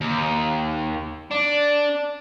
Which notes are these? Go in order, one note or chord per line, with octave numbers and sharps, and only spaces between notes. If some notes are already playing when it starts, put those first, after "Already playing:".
D#2
D4